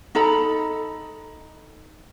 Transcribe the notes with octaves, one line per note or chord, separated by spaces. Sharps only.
D#4 A4 A#5 B5